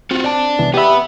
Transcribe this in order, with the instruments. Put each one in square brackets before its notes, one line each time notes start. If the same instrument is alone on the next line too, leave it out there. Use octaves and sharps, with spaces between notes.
[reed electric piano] C4 [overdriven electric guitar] F4 F#4
[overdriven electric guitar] D5 A5
[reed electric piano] C2 E3 B3
[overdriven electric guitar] B3 B5 [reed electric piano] G4 E5